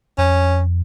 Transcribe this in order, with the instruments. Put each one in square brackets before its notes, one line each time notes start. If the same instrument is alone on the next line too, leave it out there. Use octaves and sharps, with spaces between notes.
[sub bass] F2 [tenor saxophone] C#4